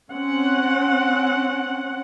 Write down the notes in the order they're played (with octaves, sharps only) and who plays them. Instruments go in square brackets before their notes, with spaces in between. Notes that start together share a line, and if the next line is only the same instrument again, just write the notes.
[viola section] C4 C#4 F#5